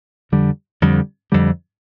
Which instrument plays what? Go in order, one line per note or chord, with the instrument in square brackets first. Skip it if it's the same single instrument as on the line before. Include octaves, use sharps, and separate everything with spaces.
[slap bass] F2 D3 G3
F2 D3 G3
F2 D3 G3